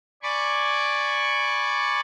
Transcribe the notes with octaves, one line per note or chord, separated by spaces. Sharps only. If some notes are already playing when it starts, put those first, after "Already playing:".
D5 G#5 B5 C#6 D6